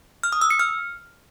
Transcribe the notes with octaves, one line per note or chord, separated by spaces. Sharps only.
F6
D#6
E6
C#7
F6